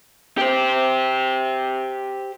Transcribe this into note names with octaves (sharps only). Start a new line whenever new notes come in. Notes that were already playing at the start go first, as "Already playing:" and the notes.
G4 C5